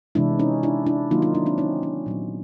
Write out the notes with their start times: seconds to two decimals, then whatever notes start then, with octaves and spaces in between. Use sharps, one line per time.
0.15 C3 E3 G#3 D4 E4
0.39 C#4 D#4
0.63 D4 E4
0.86 D4 E4
1.11 D#3 F#3 A#3 D#4 F4
1.22 D#4 F4
1.35 D4 E4
1.46 C4 D4
1.58 C#4 D#4
1.83 C#4
2.06 A#2 F#3 B3